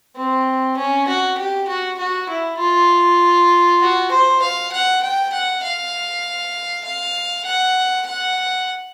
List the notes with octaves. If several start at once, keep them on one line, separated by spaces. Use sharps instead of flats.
C4
C#4
F#4
G4
F#4
F#4
E4
F4
F#4
C5
F5
F#5
G5
F#5
F5
F5
F#5
F#5